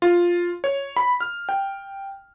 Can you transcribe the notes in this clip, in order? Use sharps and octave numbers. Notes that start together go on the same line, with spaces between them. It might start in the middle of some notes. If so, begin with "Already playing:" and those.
F4
C#5
B5
F6
G5